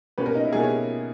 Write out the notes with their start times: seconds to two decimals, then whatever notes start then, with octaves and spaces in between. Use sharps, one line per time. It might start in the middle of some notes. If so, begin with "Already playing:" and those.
0.18 B2 G3 A#3 C#4 B4
0.26 A#4
0.35 D#4
0.45 E4
0.53 B2 G3 A#3 C#4 G#4
0.62 C#5